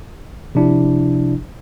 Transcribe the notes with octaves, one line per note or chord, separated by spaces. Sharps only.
C3 F3 D4 E4